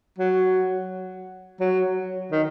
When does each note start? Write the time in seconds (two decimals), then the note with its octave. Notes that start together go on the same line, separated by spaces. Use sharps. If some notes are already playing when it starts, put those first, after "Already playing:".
0.19 F#3
1.60 F#3
2.32 D#3